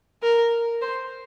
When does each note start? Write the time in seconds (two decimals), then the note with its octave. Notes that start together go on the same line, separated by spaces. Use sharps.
0.23 A#4
0.82 C5